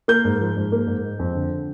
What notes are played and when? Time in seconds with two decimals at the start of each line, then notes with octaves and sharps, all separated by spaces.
0.08 A#3 G6
0.25 G#2
0.40 F3
0.57 G#2
0.72 A#3
0.87 G#2
1.04 G#3
1.19 F2
1.35 D3